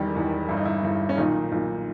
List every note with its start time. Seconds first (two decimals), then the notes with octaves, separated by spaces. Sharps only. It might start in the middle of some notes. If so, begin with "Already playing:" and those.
Already playing: E1 E2 D#3 G3 G4
0.15 E1 E2 D#3
0.49 G1 G2 E3 E4
0.57 D#4
0.65 E3 E4
0.83 G1 G2 E3
1.09 C#4
1.17 B1 A#2 D#3 D#4
1.52 B1 A#2